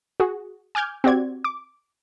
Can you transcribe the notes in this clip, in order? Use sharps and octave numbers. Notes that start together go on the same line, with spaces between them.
F#4 G#4
G#5 D6 F6 G6 G#6
C4 F#4 G4 D5 G#6
D6